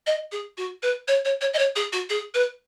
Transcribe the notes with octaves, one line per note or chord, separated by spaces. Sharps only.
D#5
G#4
F#4
B4
C#5
C#5
C#5
D#5
C#5
G#4
F#4
G#4
B4